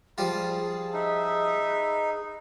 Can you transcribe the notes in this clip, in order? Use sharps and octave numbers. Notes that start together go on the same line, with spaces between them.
F3 G3 F4 G#4 A5
D#4 B4 D#5 E5